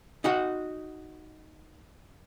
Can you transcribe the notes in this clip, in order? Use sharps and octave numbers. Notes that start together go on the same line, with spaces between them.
D#4 F#4 F#5